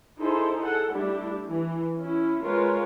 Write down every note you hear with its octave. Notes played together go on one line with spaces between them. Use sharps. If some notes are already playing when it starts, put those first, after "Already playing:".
D#4 E4 G#4 A4 C5
G#4 A4 F#5
G3 A3 D4 E4 G4
E3
C#4 E4
G#3 F4 A#4 B4 C#5